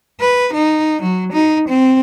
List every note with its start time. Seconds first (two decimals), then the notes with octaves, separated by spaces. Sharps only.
0.20 B4
0.53 D#4
1.02 F#3
1.32 D#4
1.68 C4